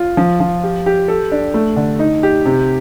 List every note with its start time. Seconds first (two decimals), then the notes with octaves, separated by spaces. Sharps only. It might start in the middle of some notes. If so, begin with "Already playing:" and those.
Already playing: F4
0.17 F3
0.40 F3
0.64 G4
0.86 G4
1.08 A4
1.31 D4
1.54 A3
1.76 D3
1.99 D#4
2.23 G4
2.46 C3